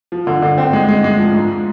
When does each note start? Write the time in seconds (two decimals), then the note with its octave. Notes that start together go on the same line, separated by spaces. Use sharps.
0.12 F3
0.27 D3
0.42 D3
0.58 C4
0.73 G#3
0.89 G#3
1.04 G#3
1.19 F3
1.34 G#2